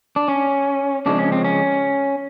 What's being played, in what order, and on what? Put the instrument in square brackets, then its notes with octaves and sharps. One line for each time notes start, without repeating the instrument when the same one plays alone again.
[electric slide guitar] D4
C#4
C#3 F3 G#3 C4 D4
C#4
C4
C#4